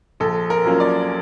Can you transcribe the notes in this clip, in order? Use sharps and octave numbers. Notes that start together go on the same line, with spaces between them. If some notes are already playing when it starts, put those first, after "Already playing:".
A#1 A4
A#4
A#2 F#3 A#3 C#4
D5